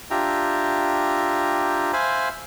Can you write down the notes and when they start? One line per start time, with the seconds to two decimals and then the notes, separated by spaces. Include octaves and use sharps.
0.10 D4 F4 G4 E5 G5 A#5
1.93 C5 E5 F5 G#5 B5